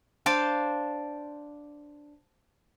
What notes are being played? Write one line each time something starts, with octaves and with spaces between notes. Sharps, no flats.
D4 C5 D5 F5